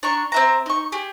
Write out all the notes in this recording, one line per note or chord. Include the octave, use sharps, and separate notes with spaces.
D4 A#5 C#6
C4 E5 A#5
D#4 C#6
G4 G#4